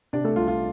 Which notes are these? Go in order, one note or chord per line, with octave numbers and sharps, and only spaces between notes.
C3 D4 D5
A3 A4
C2 F4
F4